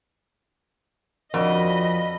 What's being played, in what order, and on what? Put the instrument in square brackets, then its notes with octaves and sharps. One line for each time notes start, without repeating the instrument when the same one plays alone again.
[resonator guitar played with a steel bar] F2 [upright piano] D4 F#4 A#4 [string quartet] D#5 B5